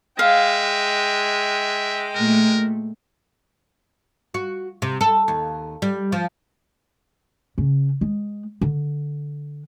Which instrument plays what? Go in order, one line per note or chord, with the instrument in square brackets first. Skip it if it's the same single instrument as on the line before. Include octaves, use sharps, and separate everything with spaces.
[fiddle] G#3 G5 [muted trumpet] E5 [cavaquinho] F5
[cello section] A#2 A3 [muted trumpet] A#4
[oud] F#4
C3
A4
D#2
G3
F3
[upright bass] C#3 C#4
G#3
D3